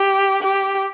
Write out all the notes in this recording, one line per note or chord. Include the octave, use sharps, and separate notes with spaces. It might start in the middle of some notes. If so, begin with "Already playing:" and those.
Already playing: G4
G4